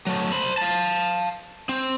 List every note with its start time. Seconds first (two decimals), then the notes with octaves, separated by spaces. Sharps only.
0.07 F#3 A3
0.32 C5 B5
0.57 F5 A5
1.69 C4